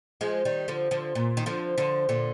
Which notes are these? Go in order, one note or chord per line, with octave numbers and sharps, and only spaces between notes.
F3 G#3
D#3 G3
D3 F3
D3 F3
A#2
D#3
D3 F3
D3 F3
A#2 D3